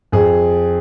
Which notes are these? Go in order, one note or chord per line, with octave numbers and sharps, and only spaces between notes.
F2 G#4